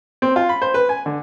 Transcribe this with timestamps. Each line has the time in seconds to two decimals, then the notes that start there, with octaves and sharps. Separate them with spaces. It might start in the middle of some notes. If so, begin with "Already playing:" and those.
0.22 C4
0.36 F4
0.49 B5
0.62 C5
0.74 B4
0.89 G#5
1.06 D3